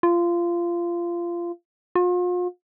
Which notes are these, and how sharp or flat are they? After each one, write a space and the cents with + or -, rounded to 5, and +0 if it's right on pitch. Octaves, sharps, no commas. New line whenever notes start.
F4 -20
F4 +40